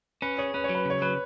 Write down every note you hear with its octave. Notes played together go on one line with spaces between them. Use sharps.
C#4 B4
G#4 C#5
C#4 B4
C#5
F#3
B4
C#3 C#5
F#3 B4